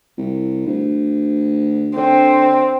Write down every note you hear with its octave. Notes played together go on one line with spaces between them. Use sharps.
C2
D2
D3 C4